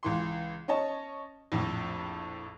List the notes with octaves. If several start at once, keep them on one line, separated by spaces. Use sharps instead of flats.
C#2 E3 C6
C#4 C#5 D#5 A5
A#1 F2 A2